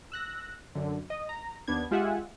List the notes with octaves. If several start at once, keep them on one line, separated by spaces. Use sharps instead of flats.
E6 F#6 A#6
F#2 D3
D#5
A#5
D#2 B3 D4 G#6
G#3 F4 G4 E5 F#5 G#5